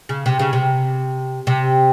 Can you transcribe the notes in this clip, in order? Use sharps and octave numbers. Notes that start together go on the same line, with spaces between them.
C#3
C3
C#3
C3
C3